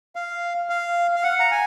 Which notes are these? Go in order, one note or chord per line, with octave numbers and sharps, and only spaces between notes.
F5
F5
F5
F#5
A#5
G#5